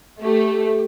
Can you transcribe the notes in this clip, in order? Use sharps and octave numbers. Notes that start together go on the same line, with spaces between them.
A3 G4